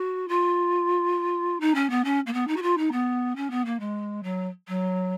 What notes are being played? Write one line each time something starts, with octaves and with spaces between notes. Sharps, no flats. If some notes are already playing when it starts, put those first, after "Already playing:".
Already playing: F#4
F4
D#4
C#4
B3
C#4
A#3
B3
D#4
F#4
F4
D#4
B3
C#4
B3
A#3
G#3
F#3
F#3